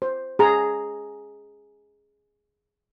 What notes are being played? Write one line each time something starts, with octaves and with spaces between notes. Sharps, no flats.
C5
G#4 F#5 A#5